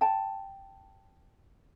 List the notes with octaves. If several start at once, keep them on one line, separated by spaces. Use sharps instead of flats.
G5 A5